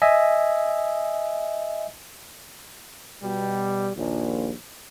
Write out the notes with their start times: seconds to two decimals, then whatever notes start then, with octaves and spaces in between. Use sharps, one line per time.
0.02 D#5 E5 G#5
3.22 B2 G3
3.96 A#1 D#2